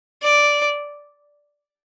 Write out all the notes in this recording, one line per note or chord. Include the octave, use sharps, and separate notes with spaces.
D5